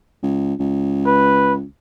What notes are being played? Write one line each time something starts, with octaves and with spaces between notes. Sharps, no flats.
C#2
C#2
B4